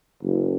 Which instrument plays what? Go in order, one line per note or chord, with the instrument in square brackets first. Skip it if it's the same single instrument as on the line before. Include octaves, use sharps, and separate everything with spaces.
[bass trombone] F#1